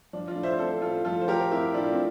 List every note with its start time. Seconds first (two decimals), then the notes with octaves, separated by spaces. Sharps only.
0.13 F3 D4
0.28 D4 F4
0.36 A2
0.43 C5 E5
0.59 C4 A4 C5
0.82 A2 F4 A4
1.05 F3 F4 A4
1.21 C5
1.28 A2 G4 A#4
1.51 C4 E4 G4
1.74 A2 D4 F4
1.92 C4